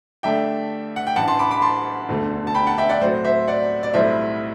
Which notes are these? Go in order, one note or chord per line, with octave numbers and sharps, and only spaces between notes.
G2 D3 A3 D4 E5 G5
F#5
G5
A1 G2 E3 F#5 A5
A5 C6
B5 D6
B5 D6
A5 C6
E1 D2 D3 A3
A5
G5 B5
F#5 A5
E5 G5
D5 F#5
A2 F#3 C4 C5
C5 E5
D5 F#5
D5
B1 A2 G3 C4 E4 C5 E5